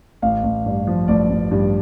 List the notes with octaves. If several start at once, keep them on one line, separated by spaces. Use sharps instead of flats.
A1 F5
A1
G2
F3
A1 D5
A1
G2